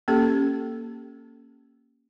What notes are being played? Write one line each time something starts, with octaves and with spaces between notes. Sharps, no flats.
A#3 C#4 G4 A4